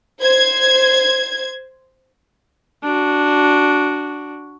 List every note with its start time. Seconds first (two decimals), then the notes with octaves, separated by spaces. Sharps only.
0.21 C5 G#6
2.83 D4 F#4